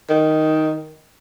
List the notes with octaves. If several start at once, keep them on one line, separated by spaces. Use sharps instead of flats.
D#3